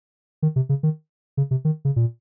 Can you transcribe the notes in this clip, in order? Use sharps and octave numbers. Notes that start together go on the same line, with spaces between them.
D#3
C3
C#3
D#3
C#3
C3
D#3
C#3
A#2